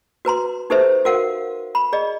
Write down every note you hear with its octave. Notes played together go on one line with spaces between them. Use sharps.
F#4 B4 A#5 C6
D#4 G4 A4 B4 C5 E5
F#4 A#4 F5 F#5
B5
G#4 D5 D#5